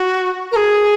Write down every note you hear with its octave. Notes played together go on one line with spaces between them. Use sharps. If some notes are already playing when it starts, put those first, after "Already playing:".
Already playing: F#4
A#4
G#4